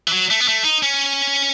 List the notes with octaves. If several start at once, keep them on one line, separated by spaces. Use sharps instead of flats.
E3
F#3
A3
B3
A3
D#4
C#4